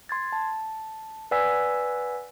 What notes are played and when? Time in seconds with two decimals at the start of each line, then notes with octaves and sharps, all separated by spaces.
0.09 C6 G#6 A6
0.33 A5
1.31 B4 D5 F#5 G#5 E6 B6